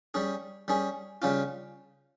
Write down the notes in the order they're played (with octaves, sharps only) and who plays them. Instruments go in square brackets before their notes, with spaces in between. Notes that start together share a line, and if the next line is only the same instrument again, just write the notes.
[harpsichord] G3 C#4 G#4
G3 C#4 G#4
C#3 G3 C#4 F4